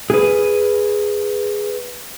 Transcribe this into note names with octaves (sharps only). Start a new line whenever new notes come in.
G#4 B4